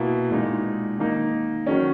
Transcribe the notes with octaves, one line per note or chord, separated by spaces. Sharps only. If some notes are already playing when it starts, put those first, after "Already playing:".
Already playing: B2 A#3 E4
A#2 G#3 D#4
D#3 A#3 D#4
D#3 F#3 C#4